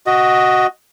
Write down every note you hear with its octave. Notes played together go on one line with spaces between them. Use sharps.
F#4 D#5